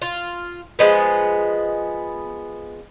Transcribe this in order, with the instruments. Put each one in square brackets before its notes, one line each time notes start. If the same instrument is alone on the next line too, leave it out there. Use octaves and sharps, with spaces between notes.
[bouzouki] F4
F3 G#3 B3